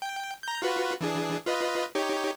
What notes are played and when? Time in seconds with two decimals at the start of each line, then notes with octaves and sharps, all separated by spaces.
0.02 G5
0.43 A#5 G6
0.62 F4 F#4 B4
1.01 E3 D4 G#4
1.46 F4 B4 D#5
1.95 D#4 G4 C#5